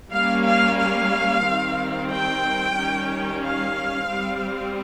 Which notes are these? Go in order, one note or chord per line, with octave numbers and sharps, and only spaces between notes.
G3 A#3 C#4 F5
F5
F5
D#3 G3 C4
G5
D#3 G3 C#4
F5
G3 C4